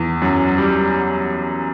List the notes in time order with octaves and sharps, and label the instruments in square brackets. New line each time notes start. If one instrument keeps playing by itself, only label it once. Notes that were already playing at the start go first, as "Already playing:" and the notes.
Already playing: [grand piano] E2
F#2
G3